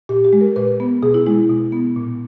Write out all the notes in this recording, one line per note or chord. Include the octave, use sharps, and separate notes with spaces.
A#2 G4
G4
G#3
A#4
A#2 B4
B3
B2 G#4
E4
G#3 E4
B2
B3
A#2